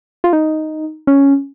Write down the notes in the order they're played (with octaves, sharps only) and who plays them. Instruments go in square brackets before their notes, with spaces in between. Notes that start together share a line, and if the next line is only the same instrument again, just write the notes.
[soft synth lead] F4
D#4
C#4